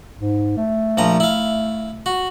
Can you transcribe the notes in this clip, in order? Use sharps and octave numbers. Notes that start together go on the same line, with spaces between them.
G#2
A3
A#1 F3 A#5
E4 F5
F#4